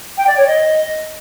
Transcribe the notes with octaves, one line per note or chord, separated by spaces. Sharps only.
G5
D5
C#5
D#5